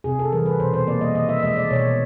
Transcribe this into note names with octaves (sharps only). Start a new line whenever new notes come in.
C3 G#4
A4
E3 G3 A#4
B4
B2 C5
C5
G3 A#3 D5
D#5
D#3 D#5
E5
G#3 D#5
D5
B2 C#5